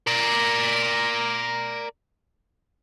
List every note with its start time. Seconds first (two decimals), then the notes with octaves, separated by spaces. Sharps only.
0.07 A#4 D5